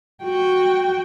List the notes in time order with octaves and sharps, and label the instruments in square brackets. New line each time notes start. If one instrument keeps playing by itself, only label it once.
[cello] F#4 G5